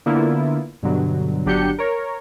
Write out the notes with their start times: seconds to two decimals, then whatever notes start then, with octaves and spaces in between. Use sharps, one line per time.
0.06 D3 A#3 B3 E4 F4
0.83 G2 B2 D3 F#3
1.45 G1 F#3 D4 G4 G6 C#7
1.79 A#4 C#5